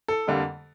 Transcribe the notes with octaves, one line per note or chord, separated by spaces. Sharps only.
A4
F2 D3 G3 A#3